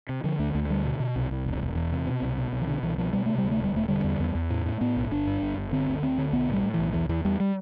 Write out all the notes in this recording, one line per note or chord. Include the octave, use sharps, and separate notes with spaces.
C3
D3 F3
D2 A3
D2 A3
D3 G3
B2
B2
C2
C2
E1
E1
E2
C3
B2
C2
B2
C2
E3
B2 D3
C2 E3
B2 F3
B2 G3
C3 A3
G3
D2
A3
E1 G3
E1 A3
D3 G3
E2
E2
E2
A2
A2
A2 B3
B1
G1 D4
G2
G1
G1
D3 C4
D2
D2 C4
D3
B1 B3
A2 G3
A2
B1 E3
E2 E3
E2 E3
E2 G3
G3